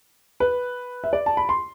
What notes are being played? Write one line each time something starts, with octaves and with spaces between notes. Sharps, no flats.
B4
E5
D5
A5
B5
C6